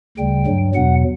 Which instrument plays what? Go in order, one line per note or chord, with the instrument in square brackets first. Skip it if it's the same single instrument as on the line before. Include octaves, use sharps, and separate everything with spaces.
[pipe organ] D2 C#3 G3 G5
G2 F#3
E2 B2 F#3 F#5